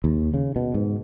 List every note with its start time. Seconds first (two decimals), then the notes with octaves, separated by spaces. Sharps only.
0.04 D#2
0.34 C#3
0.56 B2
0.74 G#2